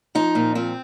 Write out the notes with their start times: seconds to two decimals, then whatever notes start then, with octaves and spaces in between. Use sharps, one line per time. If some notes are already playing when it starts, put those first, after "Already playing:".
0.15 F3 D#4
0.35 A#2
0.55 F3 C4